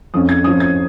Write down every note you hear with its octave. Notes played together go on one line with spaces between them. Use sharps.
F2 F3 C#4 D#6
G#6
F2 F3 C#4 D#6
G#6